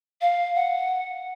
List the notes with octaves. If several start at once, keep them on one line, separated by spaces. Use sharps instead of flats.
F5
F#5